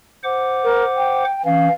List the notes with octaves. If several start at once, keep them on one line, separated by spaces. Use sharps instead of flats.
C5 F#5 D6
A#4
G5
E3 C#4 F5